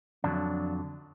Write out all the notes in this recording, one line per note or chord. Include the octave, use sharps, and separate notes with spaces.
F2 D3 F#3 D4